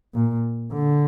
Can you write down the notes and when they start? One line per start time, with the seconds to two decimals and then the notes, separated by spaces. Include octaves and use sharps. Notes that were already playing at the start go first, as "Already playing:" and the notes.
0.15 A#2
0.73 D3